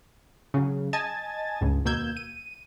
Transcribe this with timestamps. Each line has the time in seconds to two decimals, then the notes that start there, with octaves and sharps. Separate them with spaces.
0.54 C#3 F#3
0.93 D#5 G#5 A5 G#6 A6
1.61 C#2 G2
1.85 D#2 B2 A#3 E6 G6 G#6
2.17 D#7